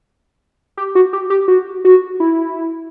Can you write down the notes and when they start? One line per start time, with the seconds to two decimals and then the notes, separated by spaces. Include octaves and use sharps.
0.77 G4
0.95 F#4
1.13 G4
1.30 G4
1.48 F#4
1.85 F#4
2.20 E4